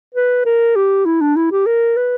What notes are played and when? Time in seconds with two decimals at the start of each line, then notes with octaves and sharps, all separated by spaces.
0.15 B4
0.45 A#4
0.76 G4
1.05 E4
1.21 D4
1.36 E4
1.52 G4
1.66 A#4
1.97 B4